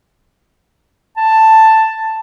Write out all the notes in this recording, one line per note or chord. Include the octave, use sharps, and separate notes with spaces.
A5